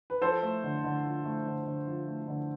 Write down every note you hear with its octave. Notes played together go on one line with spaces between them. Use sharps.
B4
F3 A4 C5
A3
D3
D3
F3
A3
D3
D3
F3
A3
D3